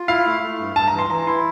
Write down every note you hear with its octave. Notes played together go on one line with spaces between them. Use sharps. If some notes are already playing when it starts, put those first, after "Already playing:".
Already playing: F4
E4 F5
A3
A3
G2
G2 A5
A#5
E3
C6
E3 A#5
E4 C6